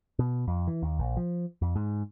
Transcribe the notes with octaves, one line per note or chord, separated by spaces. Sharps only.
B2
F2
E3
D#2
A#1
F3
F2
G#2